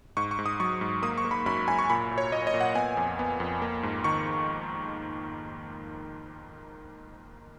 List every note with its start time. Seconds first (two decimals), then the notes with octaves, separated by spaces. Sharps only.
0.17 G#2 C#6
0.31 C#6
0.39 G#2
0.46 D#6
0.60 F#3 C#6
0.81 G#2
1.02 A#3 D#6
1.18 C#6
1.25 A#3
1.31 B5
1.46 F#2 B5
1.68 F#2 G#5
1.79 C#6
1.90 A#2 B5
2.11 A#2
2.18 C#5
2.32 A#2 D#5
2.47 D#5
2.54 A#2
2.61 F#5
2.75 B3 G#5
2.97 F2
3.19 B3
3.40 F2
3.62 A#3
3.83 G#2
4.04 D#3 C#6